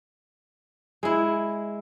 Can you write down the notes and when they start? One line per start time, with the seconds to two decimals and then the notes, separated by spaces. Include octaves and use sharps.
1.03 G#3 E4